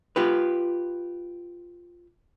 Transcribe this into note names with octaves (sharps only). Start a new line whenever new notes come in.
F4 G4 B4